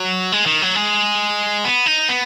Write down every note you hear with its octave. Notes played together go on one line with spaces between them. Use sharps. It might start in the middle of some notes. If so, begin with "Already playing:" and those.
Already playing: F#3
G#3
D#3
F#3
G#3
B3
D#4
B3